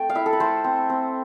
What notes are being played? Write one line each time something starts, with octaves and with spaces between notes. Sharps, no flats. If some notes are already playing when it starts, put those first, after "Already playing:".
Already playing: A3 C4 G5
F5
E4 E5
A4
B4
A3 C5
C4
C4